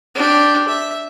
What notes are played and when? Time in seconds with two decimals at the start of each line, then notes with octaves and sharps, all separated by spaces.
0.15 D4 G4
0.68 E5